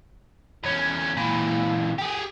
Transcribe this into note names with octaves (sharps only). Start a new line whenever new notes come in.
E2 C#4
A#2 E3
G4 G#4